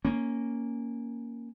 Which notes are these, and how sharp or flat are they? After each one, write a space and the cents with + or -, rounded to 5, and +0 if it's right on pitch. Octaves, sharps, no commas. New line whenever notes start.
A#3 +0 C#4 +0